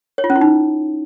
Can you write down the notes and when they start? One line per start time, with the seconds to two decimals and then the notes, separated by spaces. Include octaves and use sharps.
0.18 C#5
0.24 F4
0.30 C#4
0.36 E4
0.41 D#4